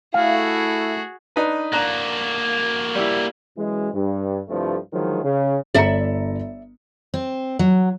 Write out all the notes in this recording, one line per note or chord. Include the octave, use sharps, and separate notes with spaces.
A3 E4 F#4 G#4 F5
D4 D#4 B4
A#3 D4 F#4 A#5 F#6
G3 E4
F#2 E3 G#3
G2
C2 G2 F3 A3
D2 D#3 F3 F#3 G#3
C#3
G1 D5 E5 A#5 C#7
C4
F#3